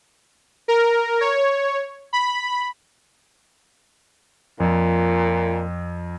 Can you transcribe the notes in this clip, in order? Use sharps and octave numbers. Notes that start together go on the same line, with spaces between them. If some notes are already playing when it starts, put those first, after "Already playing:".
A#4
C#5
B5
F2 A#2